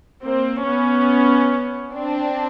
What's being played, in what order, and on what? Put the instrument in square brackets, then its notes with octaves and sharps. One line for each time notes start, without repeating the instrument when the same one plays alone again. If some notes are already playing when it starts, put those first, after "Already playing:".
[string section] A#3 C4
B3 C#4
C4 D4